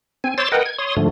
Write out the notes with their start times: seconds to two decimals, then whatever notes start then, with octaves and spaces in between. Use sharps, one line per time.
0.24 C4 G#5
0.38 C5 C#5 C6 D6 E6 A6
0.52 A#4 B4 D#5 F#5 G5
0.66 G#6
0.79 C#5 C6 D#6
0.97 G#2 D3 F3 A3